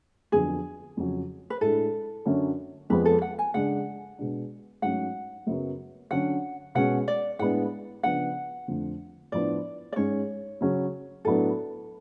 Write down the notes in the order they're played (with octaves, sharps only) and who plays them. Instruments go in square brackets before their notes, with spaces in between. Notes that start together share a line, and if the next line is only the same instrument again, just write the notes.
[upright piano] F2 D3 F#3 B3 [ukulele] G#4
[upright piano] F2 C#3 F#3 C#4
[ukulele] B4
[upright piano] A2 G#3 D4 [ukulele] A4
[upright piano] F#2 D3 F#3 C#4
[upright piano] F2 F3 G#3 B3 [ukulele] B4
[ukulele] A4
F#5
G#5
[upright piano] C#3 G#3 D4 [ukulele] F#5
[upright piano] B2 G#3 D4
[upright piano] G#2 F#3 A3 C#4 [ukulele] F#5
[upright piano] F#2 C#3 F#3 B3
[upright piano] D3 F#3 C#4 [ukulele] F#5
[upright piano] B2 G#3 C#4 [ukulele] F#5
[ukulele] D5
[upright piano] A2 G#3 B3 D4 [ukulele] F#5
[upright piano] C#3 F3 B3 D4 [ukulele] F#5
[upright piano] F2 D3 F3 A3
[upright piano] A2 F3 B3 D4 [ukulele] D5
[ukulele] D5
[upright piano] G#2 G#3 C#4 [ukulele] C#5
[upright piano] C#3 F#3 C#4
[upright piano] A2 F#3 B3 D4 [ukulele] A4